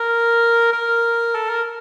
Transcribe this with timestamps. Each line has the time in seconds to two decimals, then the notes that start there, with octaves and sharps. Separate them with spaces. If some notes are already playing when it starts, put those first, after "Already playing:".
Already playing: A#4
0.73 A#4
1.35 A4
1.50 A#4